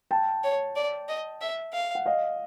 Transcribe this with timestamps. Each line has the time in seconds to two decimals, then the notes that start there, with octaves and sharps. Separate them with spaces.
0.11 G5 A5
0.44 C#5
0.76 D5
1.09 D#5
1.41 E5
1.73 F5
1.95 F#5
2.06 D#5 F5